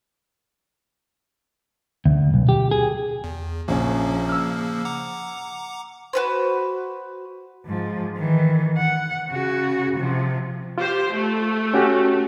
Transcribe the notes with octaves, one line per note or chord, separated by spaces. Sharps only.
D2
B1
G4
G#4
E2
A#1 C#3 F3 A#3 C#4
E6 F6
F#5 A#5 D6
F#4 B4 C5
G#2 F3
D#3 E3
F#5
C#3 F#4
C3 F3
F4 G4 C5
A3
C#4 F#4 G4